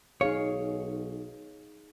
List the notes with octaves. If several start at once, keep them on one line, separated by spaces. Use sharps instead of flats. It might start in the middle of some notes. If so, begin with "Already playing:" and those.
B1 D#4 G#4 C#5 F5